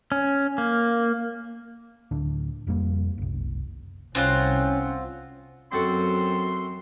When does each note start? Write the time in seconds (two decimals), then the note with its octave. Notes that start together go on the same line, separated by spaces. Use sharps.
0.12 C#4
0.58 A#3
2.11 D2 A2 D4
2.67 F1 F2 G3 A#3
3.18 F#1 C2
4.15 C2 C4 C#4 F4 F#5
5.72 F#2 C4 F#4 A4 C6